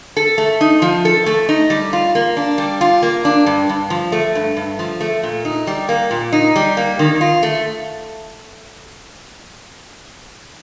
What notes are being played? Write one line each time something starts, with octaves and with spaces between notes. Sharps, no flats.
A4
A3
D#4
F3
A4
A3
D#4
G3
F4
A#3
D4
G3
F4
A#3
D4
G2
G2
F3
A3
G2
G2
F3
A3
A#2
D#4
G3
A#3
A#2
D#4
G3
A#3
D#3
F4
A3